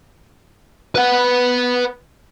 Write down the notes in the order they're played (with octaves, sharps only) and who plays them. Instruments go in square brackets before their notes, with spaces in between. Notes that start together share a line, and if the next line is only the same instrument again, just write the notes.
[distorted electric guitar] B4 F#5